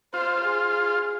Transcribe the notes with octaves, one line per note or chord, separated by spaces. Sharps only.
F4 C5
G#4